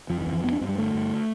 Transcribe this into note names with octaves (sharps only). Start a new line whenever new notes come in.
F2 F3
E3
F2
E3
G2 B3
D4
G2 C4
G3
D3 A3
G2